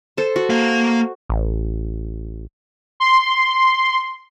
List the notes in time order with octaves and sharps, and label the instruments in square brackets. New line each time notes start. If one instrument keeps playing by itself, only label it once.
[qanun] A4 C5
F#4
[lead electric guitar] A#3 F5
[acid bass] A1
[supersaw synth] C6